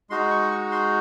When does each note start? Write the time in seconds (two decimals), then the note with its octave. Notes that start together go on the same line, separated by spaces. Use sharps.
0.10 G#3 D#4 F#4 C6
0.31 C#6
0.51 C#6
0.72 C6